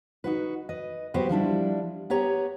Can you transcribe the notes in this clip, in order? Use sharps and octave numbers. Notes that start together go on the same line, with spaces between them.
D#4 F#4 B4
B4 D#5
F#3 B3 F#4 G4 B4 C5
F3 G3 D4 E4
B3 G4 C#5 A#5